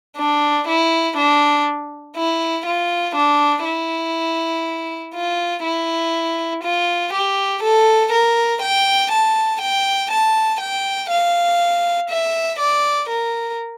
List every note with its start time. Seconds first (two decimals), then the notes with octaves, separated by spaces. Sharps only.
0.17 D4
0.68 E4
1.17 D4
2.16 E4
2.66 F4
3.15 D4
3.65 E4
5.14 F4
5.64 E4
6.64 F4
7.13 G4
7.63 A4
8.12 A#4
8.62 G5
9.11 A5
9.62 G5
10.11 A5
10.61 G5
11.11 F5
12.10 E5
12.59 D5
13.09 A#4